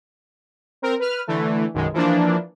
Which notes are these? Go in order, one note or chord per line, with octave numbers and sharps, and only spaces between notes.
C4 A#4
B4 F6
D3 E3 A3
B1 F#2 D#3 G#3
E3 F3 A#3 D4